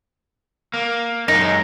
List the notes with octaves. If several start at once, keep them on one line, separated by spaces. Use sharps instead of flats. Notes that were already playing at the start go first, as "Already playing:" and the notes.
A#3
F#2 G#3 D#4